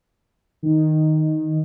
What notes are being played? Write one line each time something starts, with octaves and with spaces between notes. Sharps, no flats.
D#3